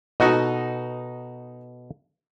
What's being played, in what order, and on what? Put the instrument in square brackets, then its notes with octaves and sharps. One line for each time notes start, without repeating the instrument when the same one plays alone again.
[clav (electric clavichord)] B2 A4 [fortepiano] D#4 F#4 D#5